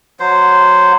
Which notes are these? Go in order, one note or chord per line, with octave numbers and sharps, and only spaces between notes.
F#3 C5